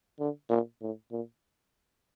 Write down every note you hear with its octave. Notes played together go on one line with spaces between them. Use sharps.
D3
A#2
A2
A#2